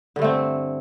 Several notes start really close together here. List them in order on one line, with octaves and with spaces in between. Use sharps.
D3 G2 A3 C4